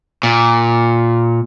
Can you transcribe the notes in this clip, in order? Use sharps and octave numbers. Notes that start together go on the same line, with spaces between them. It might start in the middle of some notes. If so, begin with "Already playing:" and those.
A#2